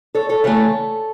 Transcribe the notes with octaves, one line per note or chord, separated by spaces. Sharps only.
A4 C#5
A4 C#5
C#3 E3 A3 A4 C#5